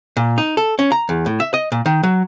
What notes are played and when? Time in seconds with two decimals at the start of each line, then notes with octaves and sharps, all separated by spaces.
0.17 A#2
0.38 D#4
0.57 A4
0.79 C#4
0.92 A#5
1.09 E2
1.26 A2
1.40 E5
1.54 D#5
1.72 A#2
1.86 D#3
2.03 F#3